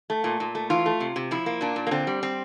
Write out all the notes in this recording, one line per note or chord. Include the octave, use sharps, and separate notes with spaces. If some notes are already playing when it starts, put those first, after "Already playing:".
A3
A#2
A#2
A3
E3 F4
A3
C3
C3
F3 E4
A#3
A#2 D4
A#2
A#3
D3 C4
G3
C4